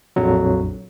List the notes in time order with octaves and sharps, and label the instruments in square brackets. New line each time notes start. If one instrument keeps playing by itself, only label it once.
[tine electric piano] A#1 F2 F#3